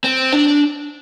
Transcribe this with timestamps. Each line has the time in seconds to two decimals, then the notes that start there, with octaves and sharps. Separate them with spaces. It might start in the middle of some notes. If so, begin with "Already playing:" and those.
0.04 C4
0.32 D4